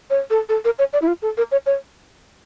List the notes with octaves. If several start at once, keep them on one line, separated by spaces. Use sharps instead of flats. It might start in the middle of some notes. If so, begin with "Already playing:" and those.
C#5
A4
A4
A#4
C#5
D5
E4
F4
A4
A#4
C#5
C#5